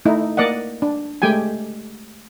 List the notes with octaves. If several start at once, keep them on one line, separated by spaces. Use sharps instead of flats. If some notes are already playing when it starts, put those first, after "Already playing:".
A3 D#4 E4
A#3 D5 D#5 F#5
D4
G#3 A3 G4 G5 G#5